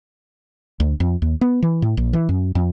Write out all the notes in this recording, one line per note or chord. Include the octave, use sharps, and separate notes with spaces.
D2
F2
D#2
B3
E3
A2
A#1
E3
F#2
F2